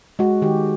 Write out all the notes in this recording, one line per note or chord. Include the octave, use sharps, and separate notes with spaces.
G#3 F#4
D#3 G4